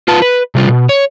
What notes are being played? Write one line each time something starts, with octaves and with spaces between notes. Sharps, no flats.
F4 B4 A5
B4
C3 G3 F4
B2
C#5